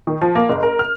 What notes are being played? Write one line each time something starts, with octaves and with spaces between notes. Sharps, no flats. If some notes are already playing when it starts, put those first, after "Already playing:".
D#3
F3
A#3
F#1
A#4
F6